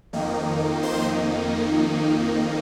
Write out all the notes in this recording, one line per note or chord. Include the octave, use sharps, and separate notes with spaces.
F2 D#3 A#3 D#4
C5 C6